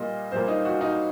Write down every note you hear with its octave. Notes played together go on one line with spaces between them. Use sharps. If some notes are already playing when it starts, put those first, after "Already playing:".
Already playing: A#2 G3 A#3 D#5
A#2 G3 A#3 C5
D#4
F#4
D#4